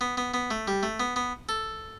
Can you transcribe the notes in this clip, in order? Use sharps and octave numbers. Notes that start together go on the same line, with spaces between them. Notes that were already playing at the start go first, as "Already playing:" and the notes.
B3
B3
B3
A3
G3
A3
B3
B3
A4